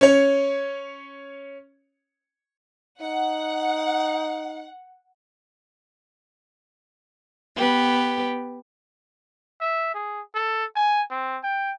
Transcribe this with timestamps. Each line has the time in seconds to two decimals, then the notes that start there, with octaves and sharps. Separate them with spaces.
0.01 C#4 C#5
3.01 D#4 F#5
7.56 B3 G4 B4
9.61 E5
9.94 G#4
10.35 A4
10.76 G#5
11.10 C4
11.44 G5